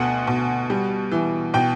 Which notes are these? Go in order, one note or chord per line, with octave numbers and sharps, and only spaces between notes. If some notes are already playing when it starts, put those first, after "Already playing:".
Already playing: D2 B2 F#5
B2
G3
E3
B2 G5